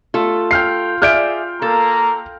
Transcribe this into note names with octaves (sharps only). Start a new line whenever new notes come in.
A3 F4 A4
F5 G5 F6 C7
G#4 D5 E5 F6 G6 D7
A#3 A4 A#5